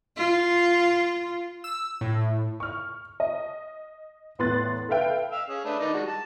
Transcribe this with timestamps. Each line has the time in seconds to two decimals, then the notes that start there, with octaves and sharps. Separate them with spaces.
0.16 F4
1.64 E6
2.01 A2
2.60 C#6 F6
3.20 D#5
4.39 E2 A2 B3 C6 F#6 A6
4.89 A4 B4 E5 F5 G5
5.32 F5 E6
5.49 C#4 G#4
5.65 A3 D4 B4
5.80 D#3 D5 D#5
5.93 G3 G#3 F#4
6.07 A5